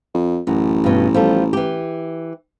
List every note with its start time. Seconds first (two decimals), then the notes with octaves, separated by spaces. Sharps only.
0.14 F2
0.47 A1 F#2
0.84 G2 B2
1.14 F3 G3 A4
1.53 E3 G4